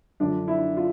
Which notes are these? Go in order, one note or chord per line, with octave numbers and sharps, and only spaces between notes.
F#2 D3 F3 D4
E4
F4